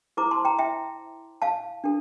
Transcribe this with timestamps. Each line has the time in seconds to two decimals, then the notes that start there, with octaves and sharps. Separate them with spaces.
0.17 E4 A4 C5 A#5 D6
0.31 A5 C6
0.45 G5 A#5
0.59 E5 G5
1.42 F5 A5
1.84 D4 A4